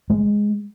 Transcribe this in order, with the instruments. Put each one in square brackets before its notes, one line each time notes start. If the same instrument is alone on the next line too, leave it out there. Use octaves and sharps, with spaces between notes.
[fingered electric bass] G#3